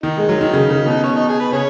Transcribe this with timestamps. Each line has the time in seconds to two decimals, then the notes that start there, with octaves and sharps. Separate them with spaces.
0.03 D#3 D#4
0.17 G#3
0.29 F#3
0.41 D#3
0.53 C#3
0.70 C#3
0.86 B2
1.04 C#4
1.16 D#4
1.29 G#4
1.40 B4
1.52 C#3 G#4 C#5